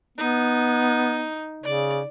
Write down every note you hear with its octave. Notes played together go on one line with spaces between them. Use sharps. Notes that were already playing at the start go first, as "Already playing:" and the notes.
B3 D#4
C#3 D5